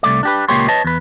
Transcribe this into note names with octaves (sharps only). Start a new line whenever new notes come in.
C2 F#2 A3 D5
D4 G4 B4
C#2 A#2 A#3 G4 C#5 C6
B4 C#5 D#5 A5
E2 B4